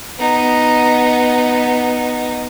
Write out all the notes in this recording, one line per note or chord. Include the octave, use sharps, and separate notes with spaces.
B3 D#4